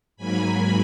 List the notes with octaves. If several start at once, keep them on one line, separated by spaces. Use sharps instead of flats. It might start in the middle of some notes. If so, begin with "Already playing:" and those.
G#2 F#3 A#3 G#5 B5